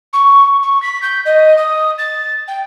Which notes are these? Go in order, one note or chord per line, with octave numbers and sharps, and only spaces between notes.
C#6
C#6
B6
G6
D#5
D#6
A6
G5